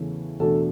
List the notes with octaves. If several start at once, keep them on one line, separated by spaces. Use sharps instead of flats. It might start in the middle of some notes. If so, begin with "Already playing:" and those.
Already playing: E2 C#3 E3 A3 C#4
E2 B2 A3 D4 A4